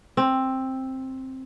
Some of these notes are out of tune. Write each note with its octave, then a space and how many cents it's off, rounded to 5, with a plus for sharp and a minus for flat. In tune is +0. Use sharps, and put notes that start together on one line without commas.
C4 +10